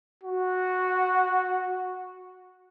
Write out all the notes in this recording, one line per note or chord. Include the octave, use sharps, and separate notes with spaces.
F#4